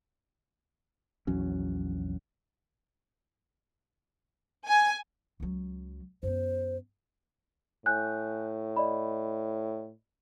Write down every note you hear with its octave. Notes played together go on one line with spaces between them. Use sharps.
A#1 E2 F#3 C#4
G#5
C#2 F#3
F#2 B3 C5
A2 G#5 F#6 G6
D5 D#5 B5